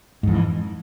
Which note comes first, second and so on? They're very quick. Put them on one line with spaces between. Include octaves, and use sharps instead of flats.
G#2 F2 E3